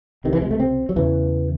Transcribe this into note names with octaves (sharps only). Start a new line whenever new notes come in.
C#2 C3 D#3
E3
G#3
A3
C4
F#3
E2 C#3 E3